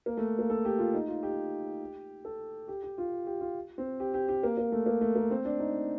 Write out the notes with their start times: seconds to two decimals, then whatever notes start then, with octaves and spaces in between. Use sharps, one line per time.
0.06 A#3
0.17 A3
0.39 A#3
0.50 A4
0.65 G4
0.79 F4
0.94 D#4
1.08 F4
1.23 G4
2.25 A4
2.68 G4
2.83 G4
2.98 F4
3.27 G4
3.41 F4
3.78 C4
4.00 G4
4.14 G4
4.28 G4
4.43 A#3
4.58 A#3
4.72 A3
4.86 A#3
5.01 A3
5.16 A#3
5.31 C4
5.45 D4
5.59 D#4